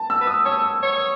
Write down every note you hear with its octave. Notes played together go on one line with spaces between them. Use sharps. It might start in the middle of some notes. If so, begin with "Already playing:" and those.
Already playing: A5
E6
B4
D#6
C#5 E6
C#5